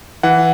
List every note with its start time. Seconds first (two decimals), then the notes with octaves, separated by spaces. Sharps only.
0.23 E3 F#5